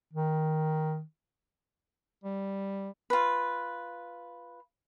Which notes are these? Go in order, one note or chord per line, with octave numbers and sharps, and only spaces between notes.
D#3
G3
F4 B4